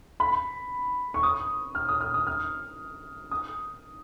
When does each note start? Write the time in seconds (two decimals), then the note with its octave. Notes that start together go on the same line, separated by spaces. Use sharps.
0.20 B5
1.14 C#6
1.23 D#6
1.75 F6
1.89 D#6
2.01 F6
2.14 D#6
2.27 F6
3.31 D#6